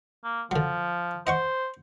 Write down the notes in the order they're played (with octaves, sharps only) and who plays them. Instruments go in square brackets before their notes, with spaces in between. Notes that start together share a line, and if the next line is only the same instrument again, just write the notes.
[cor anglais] A#3
[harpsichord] D3 F#3 [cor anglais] F3
[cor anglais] C5 [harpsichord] D#5 F#5 C#6